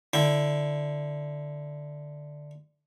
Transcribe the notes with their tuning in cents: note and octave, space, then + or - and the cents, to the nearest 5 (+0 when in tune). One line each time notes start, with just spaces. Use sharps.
D3 +0 E4 +0 G5 +0